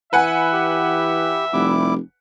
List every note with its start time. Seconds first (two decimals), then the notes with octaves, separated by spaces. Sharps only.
0.13 E3 B4 E5 F#5 G#5
0.53 G4
1.53 F1 G3 E4 D6